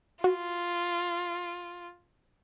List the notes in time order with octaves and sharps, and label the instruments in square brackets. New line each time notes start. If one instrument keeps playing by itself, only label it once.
[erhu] F4 [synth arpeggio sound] F#4